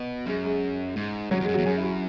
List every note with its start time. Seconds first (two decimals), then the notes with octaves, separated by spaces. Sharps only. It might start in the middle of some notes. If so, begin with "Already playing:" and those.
Already playing: B2
0.26 F#2 G#3
0.44 G#3
0.96 G#2
1.31 F#2 F#3
1.40 E2 G#3
1.48 F#2
1.54 F#4
1.58 E2
1.66 F#2 G#4
1.77 E4
1.83 F#4